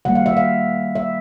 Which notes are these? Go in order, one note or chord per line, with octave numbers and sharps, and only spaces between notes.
D#3 G3 A#3 F#5
F5
E5
F5
E5